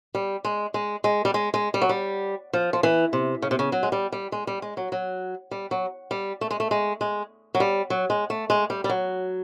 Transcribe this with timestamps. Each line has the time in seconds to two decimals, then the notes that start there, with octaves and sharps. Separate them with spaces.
0.15 G3
0.45 G#3
0.74 G#3
1.04 G#3
1.25 G3
1.34 G#3
1.54 G#3
1.74 G3
1.82 F#3
1.89 G3
2.53 F3
2.73 F3
2.83 E3
3.13 C3
3.42 C#3
3.51 C3
3.59 C#3
3.72 F#3
3.83 G#3
3.92 G3
4.12 G3
4.32 G#3
4.47 G3
4.62 G#3
4.77 F#3
4.92 F#3
5.51 G3
5.71 F#3
6.11 G3
6.41 A3
6.51 G#3
6.60 A3
6.71 G#3
7.01 G#3
7.55 F#3
7.60 G3
7.90 F#3
8.10 G#3
8.30 A3
8.50 G#3
8.70 G3
8.84 G3
8.89 F#3